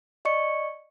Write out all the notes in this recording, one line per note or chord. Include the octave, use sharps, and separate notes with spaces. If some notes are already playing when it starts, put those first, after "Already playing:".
D5 D#5 C#6 C#7